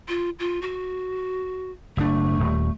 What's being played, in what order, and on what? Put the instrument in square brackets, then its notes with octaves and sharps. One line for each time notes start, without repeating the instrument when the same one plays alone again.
[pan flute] F4
F4
F#4
[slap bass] F#1 D4 [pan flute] A3
[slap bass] D#1